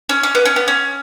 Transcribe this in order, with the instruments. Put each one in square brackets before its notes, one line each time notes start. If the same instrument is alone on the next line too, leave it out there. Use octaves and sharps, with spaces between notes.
[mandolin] C#4
C#4
B3
C#4
B3
C#4